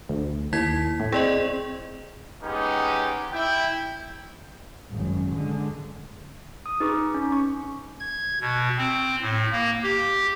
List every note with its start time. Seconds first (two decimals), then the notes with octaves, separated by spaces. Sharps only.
0.09 D2
0.53 D#2 E4 G#6 B6
1.00 A2
1.12 C4 G#4 D5 D#5
2.43 G#3 B3 C#4 D#4 G4
3.32 E4 G5
4.89 G#1 F#2
5.35 D3 G#3
6.66 D#6
6.80 D#4 G#4 B4 C#6 D6
7.14 C#4
7.32 C#6
8.00 G#6
8.41 B2
8.78 C4
9.22 A2
9.52 A#3
9.83 G4